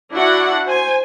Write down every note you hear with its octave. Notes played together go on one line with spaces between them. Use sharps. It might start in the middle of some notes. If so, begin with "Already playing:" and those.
D4 E4 F#4 F#5
C5 G#5